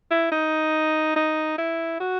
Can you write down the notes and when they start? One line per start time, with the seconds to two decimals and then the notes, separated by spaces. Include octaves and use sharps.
0.11 E4
0.32 D#4
1.16 D#4
1.58 E4
2.00 F#4